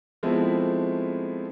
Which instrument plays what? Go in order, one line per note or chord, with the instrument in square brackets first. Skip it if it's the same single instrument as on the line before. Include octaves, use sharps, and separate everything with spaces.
[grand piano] F3 G#3 A3 B3 C4 E4